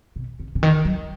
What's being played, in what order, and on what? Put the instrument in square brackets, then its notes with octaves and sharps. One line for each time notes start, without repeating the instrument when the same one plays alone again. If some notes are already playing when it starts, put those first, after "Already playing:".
[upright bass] B2
C#3
C#3
D#3
F#3